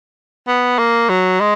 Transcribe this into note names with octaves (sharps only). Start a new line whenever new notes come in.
B3
A#3
F#3
G#3